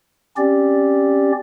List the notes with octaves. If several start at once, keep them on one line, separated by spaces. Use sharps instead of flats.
C4 C#4 G4 D5